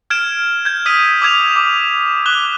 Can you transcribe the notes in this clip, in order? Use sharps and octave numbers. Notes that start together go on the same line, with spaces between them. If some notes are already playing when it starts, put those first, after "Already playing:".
F6 G#6 D7 E7
G6 G#6
D#6 E6 G#6 B6 D#7
D6 E6 G#6 F7
D6
D6 F#6 G7